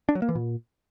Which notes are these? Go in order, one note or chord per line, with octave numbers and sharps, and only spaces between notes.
D4
F#3
A#3
E3
A#2